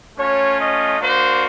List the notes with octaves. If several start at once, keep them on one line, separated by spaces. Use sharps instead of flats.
A3 C#4 F4 C#5
D#5
A#3 D4 F#4 C5